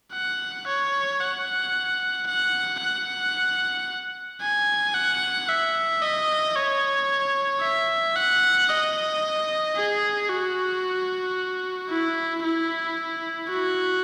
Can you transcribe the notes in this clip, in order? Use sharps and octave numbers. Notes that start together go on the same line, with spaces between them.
F#5
C#5
F#5
F#5
F#5
G#5
F#5
E5
D#5
C#5
E5
F#5
D#5
G#4
F#4
E4
E4
F#4